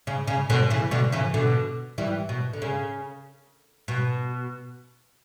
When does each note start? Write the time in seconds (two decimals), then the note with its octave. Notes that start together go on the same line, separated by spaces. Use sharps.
0.07 C#3
0.27 C#3
0.50 B2 D3
0.70 C#3 E3
0.91 B2 D3
1.12 C#3 E3
1.34 B2 D3
1.98 E3 G3
2.29 B2
2.53 D3
2.62 C#3
3.88 B2